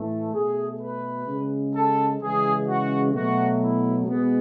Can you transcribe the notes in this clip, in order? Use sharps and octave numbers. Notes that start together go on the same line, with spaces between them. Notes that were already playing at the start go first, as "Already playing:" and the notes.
Already playing: A2 E3 A3
B2 A3 G#4
B4
C#3 G#3
A4
C#3 E3 G#3 G#4
F#4
B2 F#3 A3 F#4
E4
B2 G#3 B3